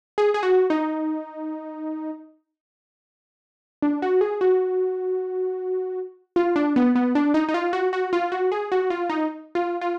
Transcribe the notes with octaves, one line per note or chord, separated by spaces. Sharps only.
G#4
G#4
F#4
D#4
D4
F#4
G#4
F#4
F4
D4
B3
B3
D4
D#4
D#4
F4
F#4
F#4
F4
F#4
G#4
F#4
F4
D#4
F4
F4